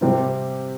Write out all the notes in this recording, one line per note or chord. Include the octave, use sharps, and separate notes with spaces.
C3 G3 C4 G4